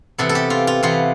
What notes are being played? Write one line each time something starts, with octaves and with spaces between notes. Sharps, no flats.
C3 E3 B3 A4
A4
G4
F4
F4
C3 E3 B3 F4